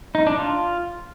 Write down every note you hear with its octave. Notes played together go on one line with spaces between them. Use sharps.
D#4
D4
F4